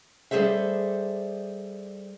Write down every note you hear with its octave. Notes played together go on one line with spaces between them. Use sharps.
G3 G#4 A4 C5 E5